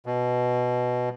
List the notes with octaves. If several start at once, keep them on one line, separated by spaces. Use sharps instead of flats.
B2